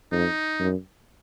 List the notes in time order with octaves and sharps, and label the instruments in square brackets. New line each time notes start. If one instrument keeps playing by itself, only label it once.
[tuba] F2 [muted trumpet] D#4
[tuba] F#2